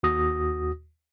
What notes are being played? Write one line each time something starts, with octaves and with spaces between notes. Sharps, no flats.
D#2 F#4 D#6 A#6